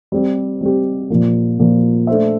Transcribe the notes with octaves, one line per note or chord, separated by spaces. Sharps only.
G3 C4 G4
G3 C4 G4
A#2 F3 A#3
A#2 F3 A#3
A3 D4 A4 C5 E5